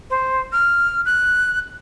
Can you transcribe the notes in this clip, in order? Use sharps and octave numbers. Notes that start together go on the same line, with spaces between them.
C5
F6
F#6